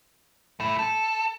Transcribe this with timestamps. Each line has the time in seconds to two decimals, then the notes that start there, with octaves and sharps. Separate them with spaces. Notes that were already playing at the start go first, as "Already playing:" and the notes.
0.60 A3 E4
0.79 A4